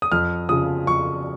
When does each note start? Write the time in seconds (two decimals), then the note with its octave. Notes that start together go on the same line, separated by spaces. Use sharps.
0.02 D#6
0.12 F2 F6
0.49 C#3 F3 D#6
0.87 F2 C#6